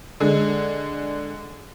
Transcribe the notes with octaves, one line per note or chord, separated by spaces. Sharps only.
D3 G#3